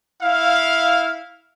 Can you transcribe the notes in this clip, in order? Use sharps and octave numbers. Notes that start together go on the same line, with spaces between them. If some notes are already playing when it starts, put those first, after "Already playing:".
E4 F5